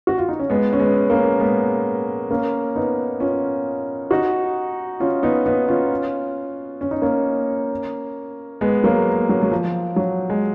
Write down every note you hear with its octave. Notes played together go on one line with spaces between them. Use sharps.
F#4
F4
D#4
C#4
G#3 B3
C#4
G#3 B3
A#3 C#4
G#3 B3
A#3 C#4
B3 D#4
C#4 F4
D#4 F#4
C#4 F4
B3 D#4
B3 D#4
C#4 F4
C#4
D#4
A#3 C#4
G#3 B3
F#3 A#3
F#3
F#3
F3
F#3
G#3